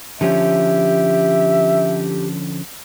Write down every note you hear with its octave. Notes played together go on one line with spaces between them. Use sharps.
D3 F3 C#4 G4 E5